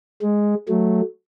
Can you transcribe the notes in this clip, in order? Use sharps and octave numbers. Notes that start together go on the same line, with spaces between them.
G#3
F#3 A3